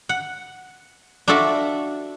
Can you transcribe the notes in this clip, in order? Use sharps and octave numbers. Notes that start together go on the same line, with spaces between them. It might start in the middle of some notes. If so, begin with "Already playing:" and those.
F#5
D4 F4 F#4 A4 E5